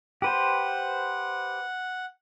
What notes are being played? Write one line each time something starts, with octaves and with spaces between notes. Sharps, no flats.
G4 B4 C5 F#5